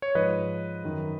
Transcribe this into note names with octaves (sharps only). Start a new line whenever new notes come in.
C#5
G#2 F3 B4 D#5
F#2 D#3